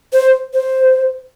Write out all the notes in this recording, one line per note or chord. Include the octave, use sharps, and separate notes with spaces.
C5
C5